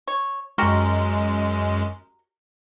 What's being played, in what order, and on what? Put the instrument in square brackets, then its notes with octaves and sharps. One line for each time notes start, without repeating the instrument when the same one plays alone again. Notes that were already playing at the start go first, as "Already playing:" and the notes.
[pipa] C#5
[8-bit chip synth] F#2 G#3 [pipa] F#4 G4 A#4